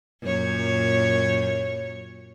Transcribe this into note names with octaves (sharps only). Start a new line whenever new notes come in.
F#2 A#2 C#5